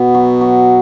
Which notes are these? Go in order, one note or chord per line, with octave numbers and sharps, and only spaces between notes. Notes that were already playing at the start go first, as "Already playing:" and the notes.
Already playing: B2 B3
F#3
F#3